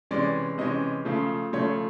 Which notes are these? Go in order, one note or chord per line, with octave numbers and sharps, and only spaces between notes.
C3 E3 G#3 C#4 D5
C3 E3 G#3 C#4 D#5
C#3 F3 A3
C#3 F3 A3 C#5